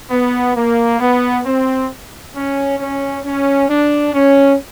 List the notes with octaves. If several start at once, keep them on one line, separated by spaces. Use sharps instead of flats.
B3
A#3
B3
C4
C#4
C#4
C#4
D4
C#4